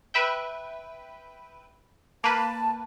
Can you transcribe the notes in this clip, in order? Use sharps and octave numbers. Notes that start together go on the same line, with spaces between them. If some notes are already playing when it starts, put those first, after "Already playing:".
B4 E5 G5
A#3 B4 A5